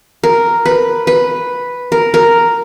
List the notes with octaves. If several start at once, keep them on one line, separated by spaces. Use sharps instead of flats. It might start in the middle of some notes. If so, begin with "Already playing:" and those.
A#4
B4
B4
A#4
A#4